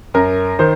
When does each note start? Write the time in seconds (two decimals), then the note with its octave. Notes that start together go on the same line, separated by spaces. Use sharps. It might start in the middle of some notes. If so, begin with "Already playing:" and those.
0.14 F#2 A#4
0.59 D#3 C5